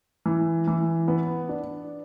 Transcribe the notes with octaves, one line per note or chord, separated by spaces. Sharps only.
E3
E3
B3
D4